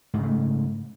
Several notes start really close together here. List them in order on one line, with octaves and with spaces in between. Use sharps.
G#2 C#3 A3